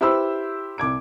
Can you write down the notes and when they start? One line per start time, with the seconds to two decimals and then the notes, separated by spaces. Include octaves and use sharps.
0.01 E4 G4 B4 C5 B5 E6
0.78 C2 D6 G#6 D7